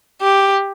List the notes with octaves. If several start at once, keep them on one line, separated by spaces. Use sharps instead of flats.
G4